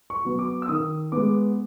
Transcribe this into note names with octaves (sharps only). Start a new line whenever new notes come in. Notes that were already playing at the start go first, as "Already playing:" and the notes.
C#6
F#3 B3
D6
E6
D#3 D#6
G#3 B3 D6